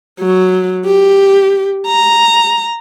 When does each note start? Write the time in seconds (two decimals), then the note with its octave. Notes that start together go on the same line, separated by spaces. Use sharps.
0.20 F#3
0.85 G4
1.87 A#5